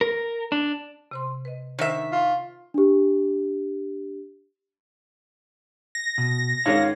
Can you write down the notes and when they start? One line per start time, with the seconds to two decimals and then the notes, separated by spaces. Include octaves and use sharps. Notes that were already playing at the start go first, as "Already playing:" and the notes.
0.01 A#4
0.52 D4
1.11 C3 C5 C6
1.45 B4 D#5
1.79 D#3 D4 A#4 C5 E5
2.12 F4
2.74 D4 G4
5.95 A#6
6.18 B2
6.66 G#2 D#3 C#4 F4 C#5 F5